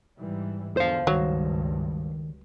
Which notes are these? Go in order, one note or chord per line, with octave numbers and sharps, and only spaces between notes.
G#2 E3 G3
E2 D3 C5 F5
C#2 G2 D#3 F#3